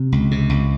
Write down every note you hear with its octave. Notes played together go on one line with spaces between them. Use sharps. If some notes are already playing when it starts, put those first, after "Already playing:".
Already playing: C3
C#2
C3
C#2